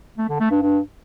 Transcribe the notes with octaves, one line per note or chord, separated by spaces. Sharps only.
A3
D3
A3
G2
G2